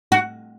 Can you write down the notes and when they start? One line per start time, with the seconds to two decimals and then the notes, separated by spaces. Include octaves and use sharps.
0.12 F#4